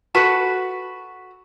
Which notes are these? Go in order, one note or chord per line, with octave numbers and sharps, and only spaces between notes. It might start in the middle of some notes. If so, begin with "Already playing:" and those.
F#4 A4 B4